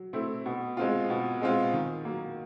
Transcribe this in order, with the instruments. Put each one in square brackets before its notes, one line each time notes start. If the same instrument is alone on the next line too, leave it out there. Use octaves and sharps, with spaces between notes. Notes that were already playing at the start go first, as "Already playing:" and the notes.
Already playing: [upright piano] F#3
A3 C4 E4
B2
G#3 C4 F4
B2
G#3 C4 F4
D#3
F#3 A#3